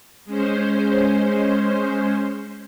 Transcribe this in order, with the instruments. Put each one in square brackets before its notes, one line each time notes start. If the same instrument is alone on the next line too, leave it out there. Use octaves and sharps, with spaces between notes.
[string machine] G#3 C#4 C5